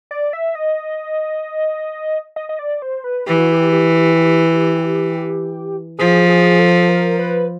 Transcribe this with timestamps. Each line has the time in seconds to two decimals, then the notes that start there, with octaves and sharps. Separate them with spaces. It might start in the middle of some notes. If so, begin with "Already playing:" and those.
0.11 D5
0.33 E5
0.55 D#5
2.36 D#5
2.49 D#5
2.59 D5
2.82 C5
3.04 B4
3.27 E3 G4
3.39 F#4
3.52 G4
3.73 G4
5.99 F3 G#4
6.29 G#4
6.59 A4
6.89 A#4
7.19 B4